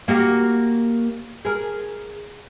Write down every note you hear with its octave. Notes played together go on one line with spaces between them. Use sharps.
A#3 F#4 G4
G#4 A#4